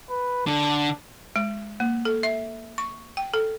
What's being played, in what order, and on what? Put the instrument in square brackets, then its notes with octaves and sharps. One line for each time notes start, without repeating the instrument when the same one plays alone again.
[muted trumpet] B4
[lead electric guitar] D3 [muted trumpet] D4
[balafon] G#3
A#3
A4
E5
C#6
G5
A4